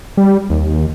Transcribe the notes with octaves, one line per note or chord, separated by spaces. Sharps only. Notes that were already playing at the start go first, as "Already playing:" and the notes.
G3
D#2